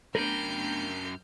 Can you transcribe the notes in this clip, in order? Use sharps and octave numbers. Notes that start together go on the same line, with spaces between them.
F#2 A3 B3 D4 A#4 G5 F6 G6